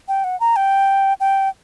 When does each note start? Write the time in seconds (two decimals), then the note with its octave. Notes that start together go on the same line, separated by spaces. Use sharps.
0.08 G5
0.24 F#5
0.40 A#5
0.56 G5
1.20 G5